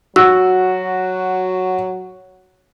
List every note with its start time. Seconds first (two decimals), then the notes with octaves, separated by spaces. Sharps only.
0.16 F#3 F#4 E6